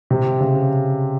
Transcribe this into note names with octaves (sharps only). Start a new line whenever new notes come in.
C3
C#3